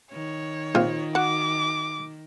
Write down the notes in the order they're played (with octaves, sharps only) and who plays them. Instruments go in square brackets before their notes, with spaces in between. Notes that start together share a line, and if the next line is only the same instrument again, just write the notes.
[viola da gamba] D#3 [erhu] C#5
[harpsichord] A#1 C4 [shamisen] F4
[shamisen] F#4 F#5 [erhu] D6